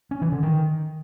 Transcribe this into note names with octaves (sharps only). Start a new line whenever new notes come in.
C#4
E3
D3
D#3